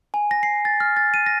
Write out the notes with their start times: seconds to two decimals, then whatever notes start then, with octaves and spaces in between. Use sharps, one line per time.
0.14 G#5
0.31 A#6
0.43 C7
0.65 A6
0.80 F6
0.97 A6
1.14 D#7
1.26 A#6